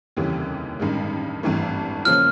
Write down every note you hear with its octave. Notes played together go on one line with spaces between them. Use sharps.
F1 D#2 C#3 E3 G3
A1 G2 D#3 G#3
G#1 G2 E3 A3
C#3 F3 A#3 C#4 F4 F6